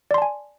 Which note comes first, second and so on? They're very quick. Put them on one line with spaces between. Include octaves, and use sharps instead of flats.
D5 C6 A5 G#5